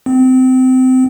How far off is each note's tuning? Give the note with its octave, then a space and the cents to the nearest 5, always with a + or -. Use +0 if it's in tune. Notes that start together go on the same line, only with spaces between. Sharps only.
C4 -25